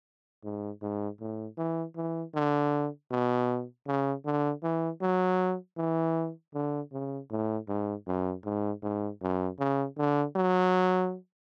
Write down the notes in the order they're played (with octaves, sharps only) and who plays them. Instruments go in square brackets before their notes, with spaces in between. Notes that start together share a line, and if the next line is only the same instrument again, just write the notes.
[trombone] G#2
G#2
A2
E3
E3
D3
B2
C#3
D3
E3
F#3
E3
D3
C#3
A2
G#2
F#2
G#2
G#2
F#2
C#3
D3
F#3